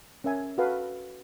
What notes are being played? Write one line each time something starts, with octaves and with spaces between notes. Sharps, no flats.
C#4 A#4 E5 G#5
F#4 A4 B4 F5